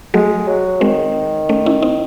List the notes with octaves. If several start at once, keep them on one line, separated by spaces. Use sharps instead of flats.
F#3 G#3 A3
F#3
D#3 G#3 C4
A3 C#4
C#4 E4
C4 D#4